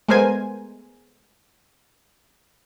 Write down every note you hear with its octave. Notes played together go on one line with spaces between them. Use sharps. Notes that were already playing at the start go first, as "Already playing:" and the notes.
G#3 A3 B3 A#4 C5 G#5